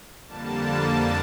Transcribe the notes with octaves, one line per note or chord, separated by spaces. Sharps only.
F2 D3 G3 A#3 A5